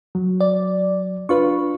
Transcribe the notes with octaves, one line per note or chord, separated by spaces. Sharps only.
F#3
D5
D4 F4 B4 C#6